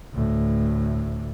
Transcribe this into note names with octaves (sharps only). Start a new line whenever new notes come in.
D2 A2